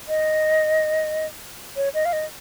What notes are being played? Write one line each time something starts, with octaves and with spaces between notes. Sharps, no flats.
D#5
C#5
D#5
F5
D#5